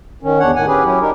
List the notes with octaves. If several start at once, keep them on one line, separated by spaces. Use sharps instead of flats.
D#3 C#4
E2 D4 C#5 F#5
A2 D#3 F#5 G#5
C#4 G4 G#4 B4
F#3 C#4 E4 G4
D4 D#4 G4 A#4